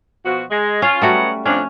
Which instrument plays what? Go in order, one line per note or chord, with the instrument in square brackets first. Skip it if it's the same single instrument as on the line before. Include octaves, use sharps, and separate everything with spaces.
[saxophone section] B2 F3 F#4
G#3
[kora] C#4 [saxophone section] F4
[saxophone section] F#3 B3 F#5 [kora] G3 A3 F#4
[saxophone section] F2 D4 [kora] C#4